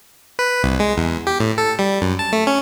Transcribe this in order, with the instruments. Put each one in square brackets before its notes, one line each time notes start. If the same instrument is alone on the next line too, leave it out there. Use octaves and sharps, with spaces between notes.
[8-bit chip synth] B4
C2
G#3
E2
G4
A2
A4
G3
F#2
A5
A3
C#4